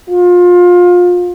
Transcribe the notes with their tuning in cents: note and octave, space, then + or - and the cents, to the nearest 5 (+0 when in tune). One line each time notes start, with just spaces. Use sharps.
F4 +25